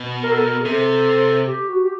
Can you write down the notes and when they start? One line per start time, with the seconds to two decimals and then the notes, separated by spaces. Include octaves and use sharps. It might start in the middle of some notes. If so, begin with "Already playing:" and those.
Already playing: B2
0.23 A#4
0.31 A4
0.38 A#4
0.60 G#4
0.65 C3 A4
1.47 G4
1.68 F#4
1.82 G4